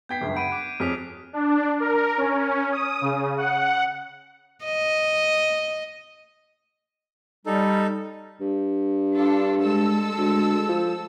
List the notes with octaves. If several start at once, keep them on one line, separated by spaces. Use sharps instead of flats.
B3 G5 G6 G#6 B6 C7
G1 C#2 F#2
F#5 B5 G6 B6 D7 D#7
D6 F#6 C7
F2 G#4 C#5 F6 B6 F7
D4
A#4
C#4
D#6
C#3
F#5
D#5
G3 D#4 A4
G2
D4 F4 A4
G#3 A4 E6
D2
F3